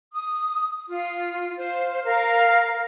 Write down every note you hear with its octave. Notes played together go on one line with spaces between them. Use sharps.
D#6
F4
C5 F5
A#4 F5